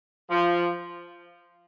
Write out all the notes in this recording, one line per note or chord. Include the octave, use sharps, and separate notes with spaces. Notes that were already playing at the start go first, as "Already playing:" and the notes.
F3